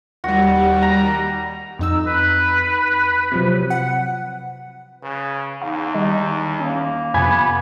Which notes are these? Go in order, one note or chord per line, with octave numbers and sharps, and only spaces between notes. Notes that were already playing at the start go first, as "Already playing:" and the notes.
D#2 G3 F#4
A#5
F2 D#4 E6
B4
C3 F3 F#3
F#5
C#3 B4
E2 D#4 F5
D#3 G3 D#5
A#3 C#4
F2 C3 B3 G#5 B5 G#6